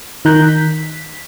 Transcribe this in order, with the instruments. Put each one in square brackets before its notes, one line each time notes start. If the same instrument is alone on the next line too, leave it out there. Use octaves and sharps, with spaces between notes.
[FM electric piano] D#3 D#4 A#5 F#6 G6
B6